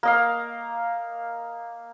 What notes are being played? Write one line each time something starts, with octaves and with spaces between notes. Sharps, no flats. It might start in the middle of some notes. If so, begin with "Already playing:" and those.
A#3 D#5 F5